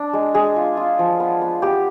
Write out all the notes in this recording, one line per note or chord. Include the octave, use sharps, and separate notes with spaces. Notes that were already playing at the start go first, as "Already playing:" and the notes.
Already playing: D4
G#3
G#3 G#4
F4
F4
F3
B3
B3
B3 G4